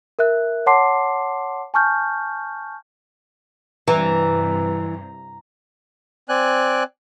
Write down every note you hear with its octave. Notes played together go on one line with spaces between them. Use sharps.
A#4 E5 F#6
C#5 F#5 A5 C6 D6 C7
G#5 A5 C#6 F6 G6
G2 C3 E3 A#5
C4 D5 G#5 F#6